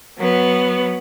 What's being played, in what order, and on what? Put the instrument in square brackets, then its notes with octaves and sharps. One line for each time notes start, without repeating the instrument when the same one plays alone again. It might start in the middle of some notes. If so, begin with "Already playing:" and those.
[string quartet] F#3 B3